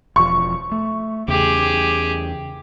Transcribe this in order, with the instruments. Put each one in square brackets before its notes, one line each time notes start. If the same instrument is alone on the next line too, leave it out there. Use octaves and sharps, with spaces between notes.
[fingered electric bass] E1 F3 [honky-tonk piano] C#6
[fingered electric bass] A3
[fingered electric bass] E2 C#3 [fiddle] G4 G#4